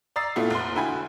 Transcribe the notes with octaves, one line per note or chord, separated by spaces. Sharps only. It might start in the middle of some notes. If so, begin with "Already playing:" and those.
D5 A#5 D#6 E6 A6 C7
A#2 A3 B3 E4 F4
F1 C6
D3 E4 F#4 G5 G#5 B5